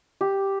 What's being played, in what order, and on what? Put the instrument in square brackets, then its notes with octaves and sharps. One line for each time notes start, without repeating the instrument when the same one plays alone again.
[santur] G4